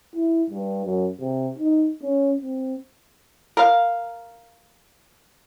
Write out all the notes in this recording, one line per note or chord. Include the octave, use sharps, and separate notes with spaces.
E4
G2
F#2
C3
D#4
C#4
C4
A#4 F5